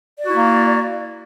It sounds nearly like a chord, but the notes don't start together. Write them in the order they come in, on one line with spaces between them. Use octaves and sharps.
D5 F#4 E4 A#3